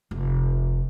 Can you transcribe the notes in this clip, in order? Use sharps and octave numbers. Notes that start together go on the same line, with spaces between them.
F1